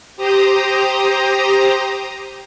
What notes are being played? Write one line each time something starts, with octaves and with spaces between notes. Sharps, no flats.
G4 C5 A#5 D#6